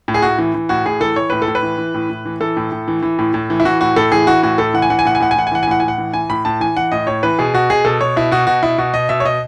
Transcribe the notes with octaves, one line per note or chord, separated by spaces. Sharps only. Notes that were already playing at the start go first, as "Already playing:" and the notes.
A2
G#4
A2 F#4
E3
E3
A2 F#4
A2 G#4
E3 A4
E3 C#5
A2 B4
A4
A2
B4
E3
E3
A2
A2
E3
E3 A4
A2
A2
E3
E3
A2
A2
E3
E4
E3 F#4
A2 F#4
A2 A4
E3 G#4
E3 F#4
A2 F#4
A2 A4
E3 F#5
G#5
E3 F#5
G#5
A2 F#5
G#5
A2 F#5
G#5
E3 F#5
G#5
E3 F#5
G#5
A2 F#5
A2 G#5
F#5
E3
E3 G#5
A2 B5
A2 A5
E3 G#5
E3 F#5
A2 D#5
A2 C#5
E3 B4
B2 G#4
B2 F#4
B2 G#4
B2 A4
B2 C#5
B2 E4
B2 F#4
B2 F#4
B2 E4
B2 F#4
B2 D#5
B2 E5
C#5
B2 D#5